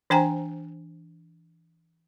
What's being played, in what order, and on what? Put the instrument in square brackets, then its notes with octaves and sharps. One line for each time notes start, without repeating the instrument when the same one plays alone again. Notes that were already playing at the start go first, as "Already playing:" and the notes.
[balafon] E3 D4 C5 G5 G#5 A#5